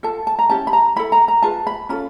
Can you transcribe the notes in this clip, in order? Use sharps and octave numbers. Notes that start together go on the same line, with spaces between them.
F4 A4 A5
A5
A#5
C#4 E4 G4 A5
B5
A#5
E4 A4 B5
A#5
A#5
F4 G#4 B4 A5
B5
C#4 F4 A4 B5